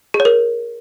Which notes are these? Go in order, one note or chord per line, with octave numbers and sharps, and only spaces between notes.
G#4
C#5
A#4